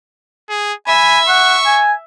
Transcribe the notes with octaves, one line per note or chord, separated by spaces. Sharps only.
G#4
E5 G#5 B5
F#5 C#6
G#5